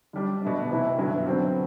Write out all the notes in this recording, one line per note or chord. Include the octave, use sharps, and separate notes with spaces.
D3 G3 D4
B2 A3 D4
C3 E3 B3 E4
G2 D3 F#3 B3 E4
D3 F#3 C4